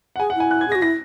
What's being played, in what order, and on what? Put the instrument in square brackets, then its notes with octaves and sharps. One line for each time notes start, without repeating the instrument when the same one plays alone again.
[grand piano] F#5
[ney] G#4 [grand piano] G#5
[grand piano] F#5
[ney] E4 [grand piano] G#5
[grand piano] F#6
G#6
[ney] G#4
[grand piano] A#6
[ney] F#4
[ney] E4 [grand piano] A#6